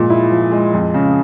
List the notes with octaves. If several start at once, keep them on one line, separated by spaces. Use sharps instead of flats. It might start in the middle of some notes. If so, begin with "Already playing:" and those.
Already playing: A#2 F3 G#3
E4
F3
G#3
F2
C#3